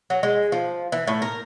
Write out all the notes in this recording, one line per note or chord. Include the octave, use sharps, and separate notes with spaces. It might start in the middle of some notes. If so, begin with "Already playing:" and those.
F#3
G#3
F3
E3
A2
A#4